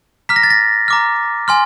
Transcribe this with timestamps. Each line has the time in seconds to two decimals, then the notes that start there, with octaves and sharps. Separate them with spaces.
0.29 A#5 D6 F6 B6
0.36 A#6
0.43 A6
0.50 A#6
0.88 A#5 D6 F6
1.48 G#5 C6 F6